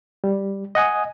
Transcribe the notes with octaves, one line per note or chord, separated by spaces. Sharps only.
G3
D#5 F#5 G#5 D#6